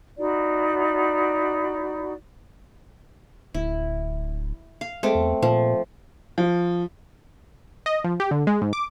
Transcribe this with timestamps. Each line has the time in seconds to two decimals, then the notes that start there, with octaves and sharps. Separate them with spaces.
0.17 D#4 E4 F#4 D5
3.54 D1 E4
4.81 F5
5.03 G#3 A3 C4 D6
5.15 E2
5.43 A#2 F3
6.38 F3
7.86 D#5
8.04 F3
8.20 G4
8.31 D3
8.47 G#3
8.62 G#2
8.73 D6